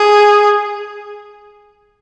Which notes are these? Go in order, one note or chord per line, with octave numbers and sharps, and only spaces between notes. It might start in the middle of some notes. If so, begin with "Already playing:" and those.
Already playing: G#4